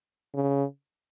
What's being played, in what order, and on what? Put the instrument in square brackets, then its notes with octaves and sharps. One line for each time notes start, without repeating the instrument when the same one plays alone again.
[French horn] C#3